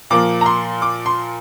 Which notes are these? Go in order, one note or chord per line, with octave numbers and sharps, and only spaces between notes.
A#2 F3 A#3 D6
A#5
C6
D6
C6